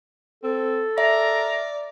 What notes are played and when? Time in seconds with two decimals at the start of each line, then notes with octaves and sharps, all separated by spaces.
0.44 C4 A4
0.98 A#4 D5 E5 A#5